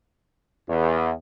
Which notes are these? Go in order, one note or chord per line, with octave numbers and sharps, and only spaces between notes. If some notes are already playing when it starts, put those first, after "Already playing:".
E2